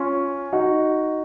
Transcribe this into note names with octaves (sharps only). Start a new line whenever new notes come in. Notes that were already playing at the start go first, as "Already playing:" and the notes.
Already playing: C#4 F4
D#4 F#4